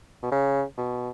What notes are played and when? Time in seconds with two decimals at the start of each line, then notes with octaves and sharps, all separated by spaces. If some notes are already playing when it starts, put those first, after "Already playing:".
0.23 B2
0.32 C#3
0.78 B2